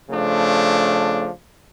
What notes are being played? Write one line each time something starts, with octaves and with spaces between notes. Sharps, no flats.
C#3 F3 A3 D4